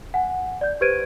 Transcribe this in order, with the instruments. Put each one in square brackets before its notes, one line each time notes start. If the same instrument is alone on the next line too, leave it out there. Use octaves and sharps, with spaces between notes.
[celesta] F#5 G#5
D5 G6
G4 B4 C5 G#6 D7 D#7